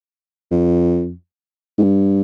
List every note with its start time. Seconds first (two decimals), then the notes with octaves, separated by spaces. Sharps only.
0.51 F2
1.78 G#2
1.82 G2